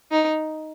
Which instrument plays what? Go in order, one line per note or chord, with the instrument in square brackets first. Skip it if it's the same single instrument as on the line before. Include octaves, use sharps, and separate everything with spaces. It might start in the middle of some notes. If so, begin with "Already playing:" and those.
[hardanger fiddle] D#4